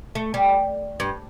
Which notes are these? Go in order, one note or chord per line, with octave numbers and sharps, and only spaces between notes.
A3
G3
G2